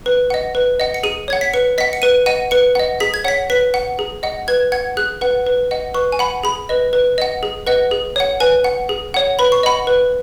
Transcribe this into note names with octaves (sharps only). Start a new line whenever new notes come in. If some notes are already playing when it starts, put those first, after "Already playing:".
B4
D#5 F#5
B4
D#5 F#5
C#7
G#4 D#7
C#5 F#5 G#6
B6
B4 C#7
D#5 F#5 B6
C#7
B4 D#7
D#5 F#5 D#7
B4 C#7
D#5 F#5
G#4 B6
G#6
C#5 F#5 B6
B4 B6
F#5
G#4
D#5 F#5
B4 G#6
F#5 G#6
G#4 F#6
B4 F#5
B4
D#5 F#5
B4 C#6
G#5
F#5 B5
G#4 B5
B4 D#5
B4
D#5 F#5
G#4
B4 D#5 F#5
G#4
C#5 F#5
B4 G#5
F#5
G#4
C#5 F#5
B4 B5
C#6
D#5 F#5 B5
B4